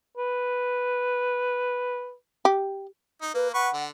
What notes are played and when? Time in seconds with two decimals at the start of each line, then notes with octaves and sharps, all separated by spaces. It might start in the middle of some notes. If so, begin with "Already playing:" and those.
0.17 B4
2.45 G4
3.22 D#4
3.34 A#3 B4
3.54 B4 F#5 C#6
3.74 D3